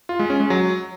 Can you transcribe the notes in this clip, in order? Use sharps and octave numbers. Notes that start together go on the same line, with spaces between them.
F4
G#3
C#4
G#3
F#3